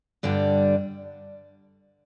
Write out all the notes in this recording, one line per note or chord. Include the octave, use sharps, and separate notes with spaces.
G2 D3 G3 D4